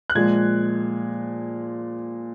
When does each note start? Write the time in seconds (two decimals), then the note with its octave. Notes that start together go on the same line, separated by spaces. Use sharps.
0.10 F#6
0.15 A#2 F3 G#3 G#6